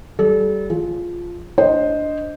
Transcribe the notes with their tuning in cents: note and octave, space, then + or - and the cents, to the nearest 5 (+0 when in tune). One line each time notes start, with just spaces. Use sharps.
G3 -25 A4 -35
F3 +0 G#4 +0
D4 +0 C5 +0 D#5 +0